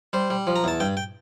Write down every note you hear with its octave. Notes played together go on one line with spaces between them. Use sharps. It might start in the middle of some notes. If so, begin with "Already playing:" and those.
G3 C5
G3
F3
A#5
E2 A5
G2 G5
G5